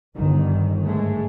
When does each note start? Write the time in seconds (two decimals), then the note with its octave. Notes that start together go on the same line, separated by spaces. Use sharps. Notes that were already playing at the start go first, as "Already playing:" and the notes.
0.15 G1 D#3
0.84 G#2 G#3 A3